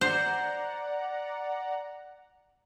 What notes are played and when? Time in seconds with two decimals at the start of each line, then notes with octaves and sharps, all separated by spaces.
0.01 C5 D5 F#5 A#5